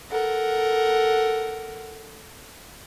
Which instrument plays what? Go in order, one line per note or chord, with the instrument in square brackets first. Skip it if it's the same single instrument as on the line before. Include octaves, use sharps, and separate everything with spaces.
[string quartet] A4 A#4 F#5